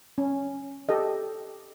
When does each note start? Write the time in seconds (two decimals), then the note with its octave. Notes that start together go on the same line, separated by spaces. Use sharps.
0.18 C#4
0.89 G4 A4 D#5